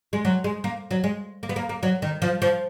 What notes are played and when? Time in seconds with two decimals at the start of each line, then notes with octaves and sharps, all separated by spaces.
0.13 G#3
0.25 F#3
0.44 G#3
0.64 A#3
0.91 F#3
1.04 G#3
1.43 A#3
1.49 B3
1.56 A#3
1.69 A#3
1.83 F#3
2.02 D#3
2.22 F3
2.42 F3